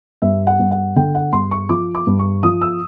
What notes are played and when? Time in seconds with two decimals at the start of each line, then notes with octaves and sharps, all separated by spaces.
0.22 G2 E5
0.47 F#5
0.60 G2
0.71 F#5
0.96 D3 G5
1.15 F#5
1.32 G2 C6
1.51 C#6
1.69 F3 D6
1.95 D6
2.07 G2
2.19 C#6
2.43 F3 D#6
2.61 E6